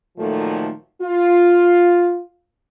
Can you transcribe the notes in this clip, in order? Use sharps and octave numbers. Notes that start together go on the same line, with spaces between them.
A#2 D#3 F3 F#3 A3
F4